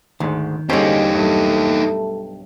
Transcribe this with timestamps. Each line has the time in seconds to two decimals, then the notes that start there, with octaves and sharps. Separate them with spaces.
0.20 D2 G#2 D#3
0.69 G#2 D3 G3 C#4 D#4 G4 C5
1.15 B1 G2 A3